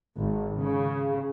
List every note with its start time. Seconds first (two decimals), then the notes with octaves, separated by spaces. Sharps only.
0.18 G#1
0.59 C#3